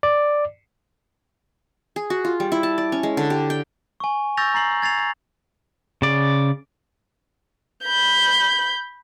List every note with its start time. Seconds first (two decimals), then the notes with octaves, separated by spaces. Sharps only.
0.03 D5
1.96 G#4
2.10 F#4
2.25 F4
2.40 G3
2.52 E4
2.63 A5
2.78 D5
2.92 C#4
3.03 G#3
3.17 D3
3.30 G4
3.50 G5
4.00 G#5 C#6
4.37 C#6 E6 G6 A6 A#6 F7
4.54 A#5 A6 C7 F#7
4.82 G#6 A6 C7 F7
6.02 C#3 D5
7.84 B5 G6